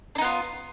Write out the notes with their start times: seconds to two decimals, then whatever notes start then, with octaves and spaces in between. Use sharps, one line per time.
0.15 D4
0.18 D#4
0.21 B3
0.24 F4